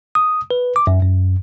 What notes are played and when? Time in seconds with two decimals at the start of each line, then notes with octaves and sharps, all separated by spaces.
0.15 D#6
0.51 B4
0.76 D6
0.87 F#2
1.03 F#2